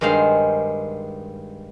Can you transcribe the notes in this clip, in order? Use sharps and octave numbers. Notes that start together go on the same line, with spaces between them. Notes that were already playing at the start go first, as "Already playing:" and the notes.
G2 D#3 G#3 C5 F5